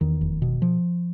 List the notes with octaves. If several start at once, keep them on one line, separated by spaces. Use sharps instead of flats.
E2 D#3
F1
B2
F3